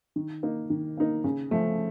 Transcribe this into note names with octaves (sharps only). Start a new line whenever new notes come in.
D#3
A#3 D#4 A#4
D#3
A#3 D#4 A#4
C#3
F3 A3